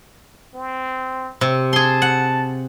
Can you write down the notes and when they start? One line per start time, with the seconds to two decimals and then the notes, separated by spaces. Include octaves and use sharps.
0.55 C4
1.41 C3
1.73 G#4 A5 C6
2.02 F#5